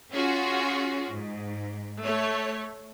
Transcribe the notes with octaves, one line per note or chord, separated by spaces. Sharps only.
C#4 F4 F#4 G#4
G#2
A3 C#5